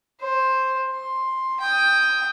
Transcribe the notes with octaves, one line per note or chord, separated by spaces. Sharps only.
C5
C6
G5 D#6